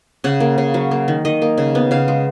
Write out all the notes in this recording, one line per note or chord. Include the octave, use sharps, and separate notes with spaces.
C#3 F#5
A#3
C#3
F#3
A#3
D#3
D#3 D#5
A#3
C#3
B3
C#3 F5
G#3